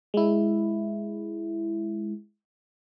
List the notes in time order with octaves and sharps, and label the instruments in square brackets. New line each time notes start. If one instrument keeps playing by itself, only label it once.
[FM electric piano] G#3 E4